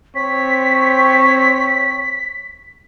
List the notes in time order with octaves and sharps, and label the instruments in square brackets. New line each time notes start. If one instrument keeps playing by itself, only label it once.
[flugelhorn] C4 [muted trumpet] C#5 [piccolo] B6